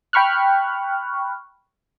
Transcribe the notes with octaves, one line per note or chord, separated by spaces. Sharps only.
G5 B5 C#6 F6 F#6